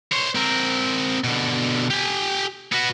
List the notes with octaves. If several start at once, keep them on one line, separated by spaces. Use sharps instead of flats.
C5 C#5
C4 A#4
B2 D3
G4 G#5
B3 F#4